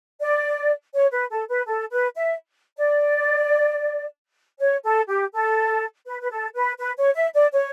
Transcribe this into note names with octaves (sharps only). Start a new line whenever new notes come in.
D5
C#5
B4
A4
B4
A4
B4
E5
D5
C#5
A4
G4
A4
B4
B4
A4
B4
B4
C#5
E5
D5
C#5